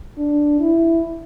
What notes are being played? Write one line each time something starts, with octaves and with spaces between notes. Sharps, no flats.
D4
E4